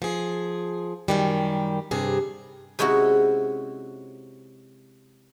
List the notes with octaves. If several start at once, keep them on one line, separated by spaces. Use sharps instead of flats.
F3 G#4
F#2 D#3 G3
G2 C3 G#4
C3 G#3 C#4 E4 F#4